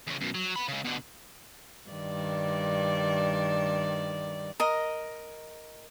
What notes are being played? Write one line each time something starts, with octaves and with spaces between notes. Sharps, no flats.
E2 C#3
F#2 B2
F#3
F#5 B5
C#3 G#3
B2 D3
G2 D#3 D5
A#4 D#5